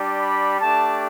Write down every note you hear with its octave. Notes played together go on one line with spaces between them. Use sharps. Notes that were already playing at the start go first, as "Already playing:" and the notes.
Already playing: G3 D4 G4
B5
A3 D4 G4 A5